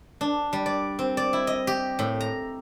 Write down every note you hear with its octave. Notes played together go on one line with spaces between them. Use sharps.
D4
G3
D5
C4
D5
E4
D#5
G4
A2
A#5